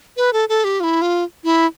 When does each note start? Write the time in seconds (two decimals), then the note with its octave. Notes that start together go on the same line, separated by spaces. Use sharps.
0.17 B4
0.33 A4
0.49 A4
0.64 G4
0.80 F4
0.84 E4
1.02 F4
1.44 E4